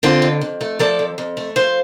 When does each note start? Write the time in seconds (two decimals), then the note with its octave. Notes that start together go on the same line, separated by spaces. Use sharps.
0.03 D3 C4 F4
0.22 F2
0.41 F2
0.61 A3
0.79 F3 A4 D5
0.99 F2
1.18 F2
1.37 A3
1.56 F3 C5 F5